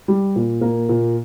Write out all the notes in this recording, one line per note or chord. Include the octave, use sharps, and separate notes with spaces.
G3
A#2
A#2 A#3 A#4
A#2